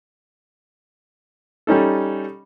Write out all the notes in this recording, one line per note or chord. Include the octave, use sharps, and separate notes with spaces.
G3 C#4 D#4 A4